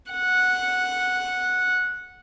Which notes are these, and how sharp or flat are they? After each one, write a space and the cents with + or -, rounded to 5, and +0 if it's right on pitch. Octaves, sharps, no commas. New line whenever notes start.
F#5 -10